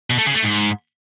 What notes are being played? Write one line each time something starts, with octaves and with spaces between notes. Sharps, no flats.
B2
A3
C#3
A3
G#2